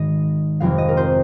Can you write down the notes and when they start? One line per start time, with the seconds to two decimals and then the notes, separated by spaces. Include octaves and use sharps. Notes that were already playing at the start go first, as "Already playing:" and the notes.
Already playing: G#1 G#2 D#3 D#5
0.60 F1 F2 F3 F5
0.78 D#5
0.88 A#4
0.97 C5